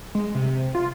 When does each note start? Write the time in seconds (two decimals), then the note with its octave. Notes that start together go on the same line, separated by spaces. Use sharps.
0.15 G#3
0.35 C3
0.75 F4